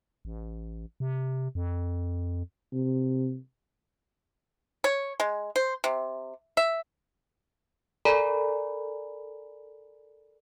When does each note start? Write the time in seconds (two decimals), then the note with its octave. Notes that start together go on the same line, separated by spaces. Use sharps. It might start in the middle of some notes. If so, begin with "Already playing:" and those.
0.25 A1
1.00 C3
1.55 F2
2.72 C3
4.84 C#5
5.20 G#3
5.56 C5
5.84 C3
6.57 E5
8.05 A4 A#4 D5 G#5 A#5 B5